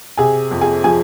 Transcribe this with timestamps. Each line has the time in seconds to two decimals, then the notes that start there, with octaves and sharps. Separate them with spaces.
0.18 C3 G#4 G#5
0.51 F2
0.61 G#4 G#5
0.84 F3 G#4 G#5